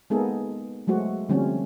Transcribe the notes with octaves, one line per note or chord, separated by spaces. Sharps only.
G#3 A#3 B3 D#4 G#4 A4
F#3 G#3 A3 F#4 C5
D3 F3 G3 A3 C4 C#4